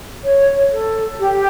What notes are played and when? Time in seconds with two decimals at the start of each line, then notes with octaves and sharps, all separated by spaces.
0.24 C#5
0.72 A4
1.19 G4